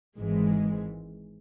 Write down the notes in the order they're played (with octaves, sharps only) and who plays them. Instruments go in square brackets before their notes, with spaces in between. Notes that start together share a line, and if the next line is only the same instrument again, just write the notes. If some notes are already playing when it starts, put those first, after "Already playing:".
[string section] G#1 G#2 E3 G#3